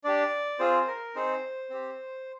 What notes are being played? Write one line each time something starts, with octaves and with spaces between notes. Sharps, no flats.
D4 G4 D5
C4 F4 G#4 C5
A#4
C4 D#4 G#4 C5
C4 G4